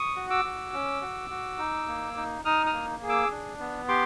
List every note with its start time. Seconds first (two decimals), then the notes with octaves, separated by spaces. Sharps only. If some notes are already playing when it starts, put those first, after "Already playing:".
Already playing: C#6 D#6
0.16 F#4
0.30 D6 E6
0.45 F#4
0.73 C#4
1.02 F#4
1.30 F#4
1.59 D#4
1.87 A#3
2.17 D#4
2.45 D#4 D#6 F6
2.66 D#6 F6
2.73 A#3
3.03 G#4
3.09 D6 E6
3.31 D4
3.60 B3
3.88 G4 C6 D6